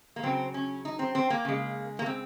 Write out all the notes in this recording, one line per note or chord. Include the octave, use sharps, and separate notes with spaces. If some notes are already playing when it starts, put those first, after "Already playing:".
A#3
C#3 F#3 C4
C#4
D#4
C4
C4
A#3
C#3 G#3
A#3
C4